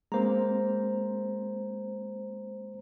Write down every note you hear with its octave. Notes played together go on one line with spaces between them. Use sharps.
G#3 A#3 C4 C5 A#5